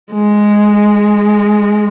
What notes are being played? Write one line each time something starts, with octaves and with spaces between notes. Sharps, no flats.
G#3